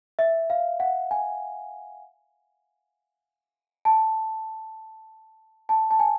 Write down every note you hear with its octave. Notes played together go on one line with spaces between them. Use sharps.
E5
F5
F#5
G#5
A5
A5
A5
G#5